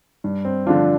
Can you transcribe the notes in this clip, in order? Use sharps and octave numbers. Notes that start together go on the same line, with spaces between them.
G2
C4
D3 F3 D4 F4